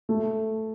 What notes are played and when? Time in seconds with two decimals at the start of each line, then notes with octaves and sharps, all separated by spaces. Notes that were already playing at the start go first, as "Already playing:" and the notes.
0.09 A3